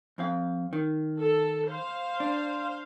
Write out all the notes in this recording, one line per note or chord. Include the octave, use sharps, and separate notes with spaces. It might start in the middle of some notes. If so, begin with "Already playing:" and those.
F2 C4 F5
D#3
A4
C5 F5
D4